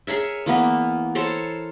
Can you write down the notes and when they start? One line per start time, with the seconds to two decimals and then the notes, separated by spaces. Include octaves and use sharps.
0.07 G#4 A#4 C#5 E5
0.46 E3 A#3 B3 A#4
1.15 A4 A#4 C5 C#5